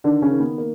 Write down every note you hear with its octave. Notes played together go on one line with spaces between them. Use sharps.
D3 D#3 D4
C#3 C#4
D#3
B3
A#3